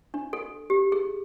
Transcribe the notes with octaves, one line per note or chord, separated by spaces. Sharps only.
D4
A4
G4
G#4